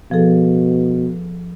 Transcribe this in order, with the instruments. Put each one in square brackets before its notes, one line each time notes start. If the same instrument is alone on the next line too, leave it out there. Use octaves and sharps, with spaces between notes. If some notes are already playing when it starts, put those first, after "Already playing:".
[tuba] B2 [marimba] F3 G#4 A4